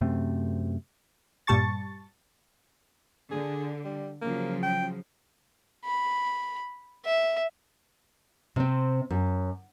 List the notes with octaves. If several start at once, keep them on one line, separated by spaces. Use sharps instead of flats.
F#2 C3 A3 C4
G2 A#2 G3 A5 C#6 A6
D3 G#4
G3
C#3 F3 F#3 A#3
G5
B5
E5
C3 C4
F#2